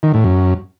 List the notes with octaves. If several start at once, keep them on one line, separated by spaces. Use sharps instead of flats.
D#3
A2
F#2